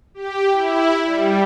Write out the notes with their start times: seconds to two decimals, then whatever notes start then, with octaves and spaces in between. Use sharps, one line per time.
0.14 G4
0.52 E4
1.05 G3